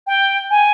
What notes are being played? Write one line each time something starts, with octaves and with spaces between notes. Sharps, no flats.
G5
G#5